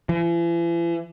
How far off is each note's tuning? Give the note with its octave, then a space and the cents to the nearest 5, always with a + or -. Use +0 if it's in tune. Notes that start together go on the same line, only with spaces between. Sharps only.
E3 +45